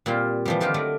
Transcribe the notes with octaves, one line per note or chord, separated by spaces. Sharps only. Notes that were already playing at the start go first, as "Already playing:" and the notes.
A#2 G3 C4 F4
E3 F3 G3
D3 G3 D#4 F4 G4
F#3 A3 A#4 D5